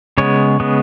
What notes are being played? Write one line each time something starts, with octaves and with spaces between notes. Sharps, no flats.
C#3 G#3 B3 C#5
C#3 G#3 B3